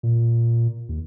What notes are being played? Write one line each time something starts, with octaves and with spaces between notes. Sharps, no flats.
A#2
D#2